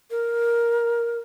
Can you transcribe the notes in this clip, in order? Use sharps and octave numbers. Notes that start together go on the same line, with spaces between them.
A#4